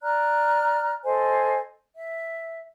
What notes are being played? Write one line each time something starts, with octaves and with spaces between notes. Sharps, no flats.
D5 A#5 F6 F#6
A4 C5 D#5 G#5
E5